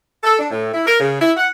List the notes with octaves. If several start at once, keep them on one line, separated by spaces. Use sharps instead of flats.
A4
D4
A2
E4
A#4
C#3
E4
F#5